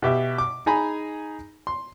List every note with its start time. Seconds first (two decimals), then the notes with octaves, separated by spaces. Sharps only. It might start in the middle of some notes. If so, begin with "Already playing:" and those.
0.02 B2 G4 E5
0.38 D6
0.66 D#4 G#4 G#5 A#5 B5
1.67 C6